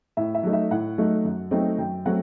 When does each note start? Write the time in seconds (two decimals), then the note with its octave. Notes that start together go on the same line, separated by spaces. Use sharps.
0.17 A2 E5
0.35 E5
0.43 F#3 A3 D#4
0.53 E5
0.71 A2 F#5
0.98 F#3 A3 D#4
1.25 F#2
1.51 F#3 A3 C4 D#4
1.78 F#2 G5
2.06 F#3 A3 C4 F#5